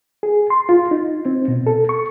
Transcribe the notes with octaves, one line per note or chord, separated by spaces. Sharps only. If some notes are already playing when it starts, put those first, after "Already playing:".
G#4
C6
F4
D#4
C4
B2
A4
C#6